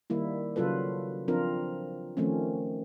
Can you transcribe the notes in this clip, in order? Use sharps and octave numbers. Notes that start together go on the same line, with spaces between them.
D#3 G3 A#3 E4
C#3 F#3 F4 A4 B4
F3 C4 D4 F4 A#4
D#3 F3 A3 C4 C#4